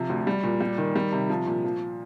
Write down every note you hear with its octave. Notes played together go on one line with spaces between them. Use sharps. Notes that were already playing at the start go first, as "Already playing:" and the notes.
Already playing: C3 F3
D2
G3
A#2
G3
D#3
G3
C3
F3
A#2
F3